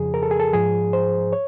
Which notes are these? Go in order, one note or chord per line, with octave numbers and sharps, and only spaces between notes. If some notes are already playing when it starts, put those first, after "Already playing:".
Already playing: F2 C#3 F3 G#4
A#4
A4
G#4
A4
G#2 F3 G#4
C5
C#5